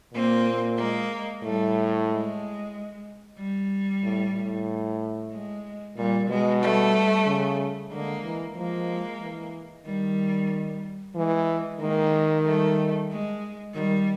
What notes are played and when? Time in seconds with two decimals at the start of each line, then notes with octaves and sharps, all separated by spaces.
0.13 A#2 A#3 C4
0.78 G#3 A#3
1.43 A2 G3 A3
2.08 G#3
3.38 G3
4.03 A2
4.35 A2
5.32 G#3
5.97 A#2 G3
6.29 B2 G#3
6.62 G3 A3
7.26 C#3
7.91 D3 G#3 A#3
8.23 E3
8.56 F3 G#3 A#3
9.21 E3
9.86 D#3 G3
11.15 E3 G#3
11.80 D#3 G#3 A#3
12.45 G3 A3
13.10 G#3
13.74 D#3 G3